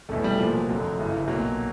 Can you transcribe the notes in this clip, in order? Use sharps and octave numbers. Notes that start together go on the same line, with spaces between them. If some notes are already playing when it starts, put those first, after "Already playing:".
F1 E2 B2 A3
G3
C2 A#2 F3
F#3
F1 F2 D3 F#3
G1 F#2 C#3 E3
B1 A#2 F#3